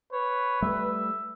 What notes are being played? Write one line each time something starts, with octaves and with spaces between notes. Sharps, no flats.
B4 C#5
G3 A3 E5